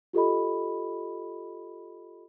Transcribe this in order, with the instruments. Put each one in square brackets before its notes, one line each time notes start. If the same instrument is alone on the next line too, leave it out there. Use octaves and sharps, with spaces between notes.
[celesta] F4 G4 A4 D#5 B5